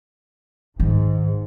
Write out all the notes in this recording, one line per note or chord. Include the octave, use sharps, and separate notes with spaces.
G#2 D#3